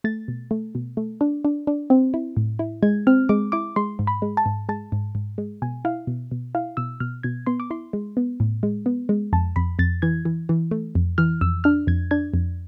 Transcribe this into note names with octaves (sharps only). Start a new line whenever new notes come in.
A3 A6
B2
A3
B2
A3
D4
D4
D4
C4
E4
A2
E4
G#3 G#6
C4 F6
G#3 D6
E4 D6
G#3 C6
G#2
B5
G#3
A5
G#2
G#3 A5
G#2
G#2
G#3
B2 G#5
E4 F5
B2
B2
E4 F5
B2 E6
B2 F6
B2 G#6
B3 C6
D6
E4 C6
G#3
B3
A2
G#3
B3
G#3
F2 A5
F2 B5
F2 A6
E3 G#6
E3
E3
A3
F2
E3 F6
F2 E6
D4 F6
F2 G#6
D4 G#6
F2